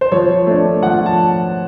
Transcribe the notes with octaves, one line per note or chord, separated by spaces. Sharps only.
C5
F3 C#5
A3 D4
F3 F#5
A5